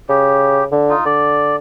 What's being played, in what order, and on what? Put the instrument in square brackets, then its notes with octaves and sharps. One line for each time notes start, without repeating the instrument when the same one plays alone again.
[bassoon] C#3 [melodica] G4
[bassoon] D3
[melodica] D#4 F4
[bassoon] D3 [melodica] D5